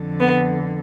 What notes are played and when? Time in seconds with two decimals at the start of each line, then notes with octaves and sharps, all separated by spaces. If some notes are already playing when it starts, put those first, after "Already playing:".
Already playing: F2 D3
0.19 B3